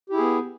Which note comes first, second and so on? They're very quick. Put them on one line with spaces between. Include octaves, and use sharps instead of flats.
G4 E4 G#4 B3